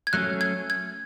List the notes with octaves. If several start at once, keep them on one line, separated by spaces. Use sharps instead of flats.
G#6
F#3 A3 C#4 F#6
G#6
G#6